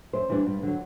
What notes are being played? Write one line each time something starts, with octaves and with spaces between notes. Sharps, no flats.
F#2 C5
E3 G3 D4
G2
D3 F#3